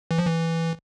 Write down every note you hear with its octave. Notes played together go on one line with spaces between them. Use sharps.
E3
F3
E3